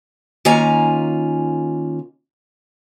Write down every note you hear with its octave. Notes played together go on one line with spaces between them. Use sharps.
D#3 A#3 C#4 F4 G#5 A#5